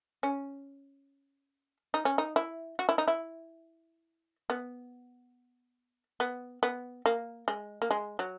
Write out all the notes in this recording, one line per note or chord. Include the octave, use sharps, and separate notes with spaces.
C#4
D#4
C#4
D#4
E4
F#4
E4
D#4
E4
B3
B3
B3
A#3
G#3
A#3
G#3
F#3